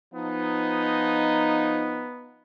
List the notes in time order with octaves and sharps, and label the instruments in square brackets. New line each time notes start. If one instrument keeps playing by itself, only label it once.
[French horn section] F3 D#4 [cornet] B3